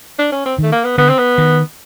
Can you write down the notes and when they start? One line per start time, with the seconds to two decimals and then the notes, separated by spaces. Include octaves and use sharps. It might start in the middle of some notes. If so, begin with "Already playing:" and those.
0.19 D4
0.32 C#4
0.46 C4
0.58 D#3 A3
0.72 A#3
0.85 B3
0.98 D3 B3
1.09 C4
1.18 B3
1.38 D#3